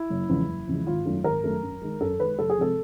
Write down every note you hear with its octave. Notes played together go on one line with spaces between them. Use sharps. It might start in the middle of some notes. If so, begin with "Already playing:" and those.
Already playing: E4
F#1
E2 C#3 F3 G#3
F#1
E2 C#3 F3 G#3
G#1 F4
F#2 D#3 F#3 A3
G#1 A#4
F#2 D#3 F#3 A3
F#2
D#3 G#3
F#2 A4
D#3 G#3 B4
F#1 A4
G#4
C3 F3 G#3 A4